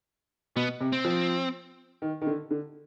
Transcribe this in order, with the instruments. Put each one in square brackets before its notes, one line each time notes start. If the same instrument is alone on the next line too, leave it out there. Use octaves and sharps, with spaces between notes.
[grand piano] B2 [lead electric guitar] B3
[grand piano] C3
[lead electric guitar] C4
[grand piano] F3
D#3
D#3
D3
D3